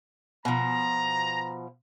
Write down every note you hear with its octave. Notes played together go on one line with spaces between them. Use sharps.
B2 F3 A#5